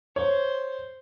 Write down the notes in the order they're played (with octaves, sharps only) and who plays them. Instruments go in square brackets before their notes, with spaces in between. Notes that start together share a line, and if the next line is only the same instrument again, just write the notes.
[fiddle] C5 [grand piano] C#5